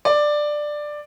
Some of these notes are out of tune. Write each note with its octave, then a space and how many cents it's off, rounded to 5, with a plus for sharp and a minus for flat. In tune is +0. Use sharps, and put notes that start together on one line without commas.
D5 +10